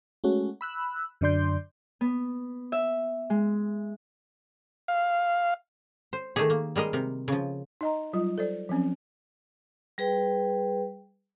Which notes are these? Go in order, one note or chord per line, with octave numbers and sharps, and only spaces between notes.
G#3 A3 C#4 F#4
B5 E6 F#6
F#2 D3 D4 D5 C6 G6
B3
E5
G#3
F5
C5
D#3 A3 D#4 G4 G#4
A#3
G3 G#3 A#4 D#5
C3 A#4
C#3 F3
D#4 D#5 A#5
F#3 G3 F4
A4 C5 D5
F3 F#3 C4 C#4
G3 G#4 B4 G5